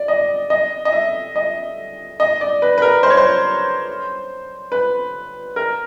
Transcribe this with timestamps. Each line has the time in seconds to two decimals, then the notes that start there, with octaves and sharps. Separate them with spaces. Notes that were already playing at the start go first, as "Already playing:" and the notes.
Already playing: D5
0.08 D#5
0.50 D#5
0.85 D#5
0.93 E5
1.36 D#5
2.20 D#5
2.41 D5
2.62 B4
2.78 B4
2.82 A#4
3.03 C5
3.10 C#5
3.17 C5
4.72 B4
5.56 A#4